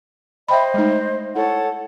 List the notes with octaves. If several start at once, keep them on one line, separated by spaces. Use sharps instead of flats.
C5 D#5 E5 G5 B5
G#3 A3 D#4
E4 A4 C#5 F#5